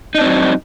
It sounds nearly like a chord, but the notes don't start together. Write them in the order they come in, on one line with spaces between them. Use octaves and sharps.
D#4 D4 C4 F#3